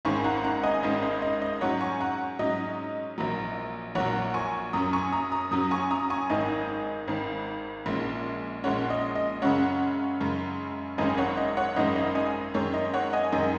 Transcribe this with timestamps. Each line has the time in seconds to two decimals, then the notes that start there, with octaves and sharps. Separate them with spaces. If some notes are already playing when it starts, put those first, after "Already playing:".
0.05 G#1 G#2 D#3 G#3 C#4 G#5 C#6
0.24 F#5 A#5
0.44 F#5 A#5
0.63 D#5 G#5
0.83 G#1 G#2 D#3 G#3 C#4 D#5
1.03 D#5
1.22 D#5
1.42 D#5
1.61 G#2 F#3 C#4 C#5 F#5
1.81 G#5 C#6
2.00 F#5 A#5
2.39 G#2 F#3 C#4 D#5
3.18 A#1 A#2 F#3
3.95 A#1 A#2 F#3 C#5 F#5
4.34 G#5 C#6
4.73 F#2 F#3 C#4 A#5 D#6
4.93 G#5 C#6
5.12 A#5 D#6
5.32 A#5 D#6
5.51 F#2 F#3 C#4 A#5 D#6
5.71 G#5 C#6
5.91 A#5 D#6
6.10 G#5 C#6
6.30 G#1 G#2 D#3 D#5 G#5
7.08 G#1 G#2 D#3
7.86 A#1 A#2 G#3 C#4
8.64 A#1 A#2 G#3 C#4 C#5 F#5
8.90 D#5
9.15 D#5
9.42 F#2 C#3 G#3 C#4 C#5 F#5
10.20 F#2 C#3 G#3 C#4
10.98 G#1 F#2 D#3 G#3 C#4 D#5 G#5
11.18 C#5 F#5
11.37 D#5
11.57 C#5 F#5
11.76 G#1 F#2 D#3 G#3 C#4 D#5
11.96 D#5
12.15 D#5 G#5
12.54 F#2 D#3 G#3 C#5
12.74 D#5
12.93 C#5 F#5
13.13 D#5 G#5
13.32 F#2 D#3 G#3 D#5 G#5